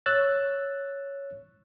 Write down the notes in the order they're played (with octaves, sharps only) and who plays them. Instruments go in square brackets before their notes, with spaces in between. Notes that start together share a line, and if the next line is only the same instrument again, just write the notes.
[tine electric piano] C#5 E6 F#6 A6